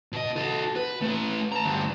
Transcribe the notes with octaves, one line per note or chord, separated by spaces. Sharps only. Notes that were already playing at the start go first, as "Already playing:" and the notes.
B2 D#5
F#4 A4
B4
A3 B4
A5 A#5
D2 G2